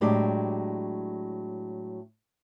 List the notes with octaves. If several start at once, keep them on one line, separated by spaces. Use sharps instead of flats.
A2 F#3 G#3 D4 G4